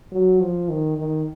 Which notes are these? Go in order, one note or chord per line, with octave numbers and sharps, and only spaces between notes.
F#3
F3
D#3
D#3